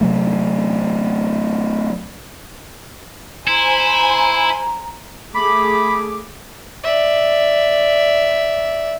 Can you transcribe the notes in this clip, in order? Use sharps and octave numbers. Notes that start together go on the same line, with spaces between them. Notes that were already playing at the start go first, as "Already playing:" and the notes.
C3 F#3 A3
E4 C5 G#5 A#5
A3 G#4 B5 D6
D5 E5